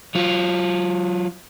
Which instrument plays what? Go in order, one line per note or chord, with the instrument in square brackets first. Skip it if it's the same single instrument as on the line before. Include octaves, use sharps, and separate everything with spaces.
[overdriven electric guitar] F#3 F4